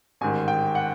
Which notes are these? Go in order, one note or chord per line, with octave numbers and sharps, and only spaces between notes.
A1 G#2 D#3 G#5
G5
F#5